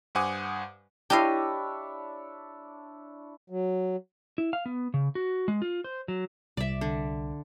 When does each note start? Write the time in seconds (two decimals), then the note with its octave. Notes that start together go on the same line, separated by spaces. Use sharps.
0.15 G2 C5 F#5 G#5 D6 D#6
1.10 D4 E4 G4 C#5 D#5 F5
3.50 F#3
4.38 E4
4.53 F5
4.66 B3
4.94 C#3
5.15 F#4
5.48 G#3
5.62 F4
5.84 C5
6.08 F#3
6.57 C2 D5 E5
6.81 D3